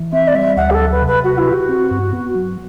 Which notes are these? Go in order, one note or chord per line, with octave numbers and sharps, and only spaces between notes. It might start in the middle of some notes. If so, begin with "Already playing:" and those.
Already playing: E3
C4 E5
D5
G3 E5
D2 F#5
G4
A4
F#3
B4
C3
B4
F#4 B4
E4
F#4 G4
C4
G2
B3
F#3